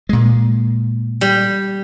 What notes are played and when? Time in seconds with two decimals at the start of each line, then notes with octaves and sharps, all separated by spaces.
0.09 A#2 G#3
1.21 G3